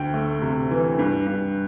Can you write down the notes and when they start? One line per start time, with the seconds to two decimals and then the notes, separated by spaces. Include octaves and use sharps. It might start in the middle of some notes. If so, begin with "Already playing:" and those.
Already playing: D2 G5
0.14 A3
0.42 C3
0.71 E3
0.99 G2
1.27 G2